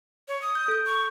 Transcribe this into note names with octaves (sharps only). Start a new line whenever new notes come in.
C#5
D#6
G6
A4 G6
C#6